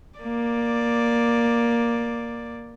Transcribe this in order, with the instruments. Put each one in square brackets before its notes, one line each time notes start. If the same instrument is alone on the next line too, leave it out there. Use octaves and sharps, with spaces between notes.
[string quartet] A#3 D5